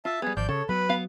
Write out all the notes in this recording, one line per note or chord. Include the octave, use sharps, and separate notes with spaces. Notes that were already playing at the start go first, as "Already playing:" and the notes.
F4 E5 A5
G3 B3 G#4
G#1 F3 D5 G6
C#3 A4 C#5
F#3 B3 B4 B5
B3 F5